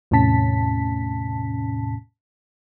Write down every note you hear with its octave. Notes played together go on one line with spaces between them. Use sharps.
E2 A2 C3 C#4 A5 B6